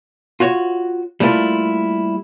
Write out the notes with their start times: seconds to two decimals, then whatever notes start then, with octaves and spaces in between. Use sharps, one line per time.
0.40 F4 F#4 C#5
1.20 G3 A3 A#3 E4 F4